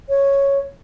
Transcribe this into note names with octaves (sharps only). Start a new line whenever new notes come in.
C#5